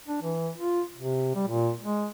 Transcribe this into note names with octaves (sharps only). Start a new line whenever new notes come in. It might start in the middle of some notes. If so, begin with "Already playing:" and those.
D4
E3
F4
C3
G3
A#2
G#3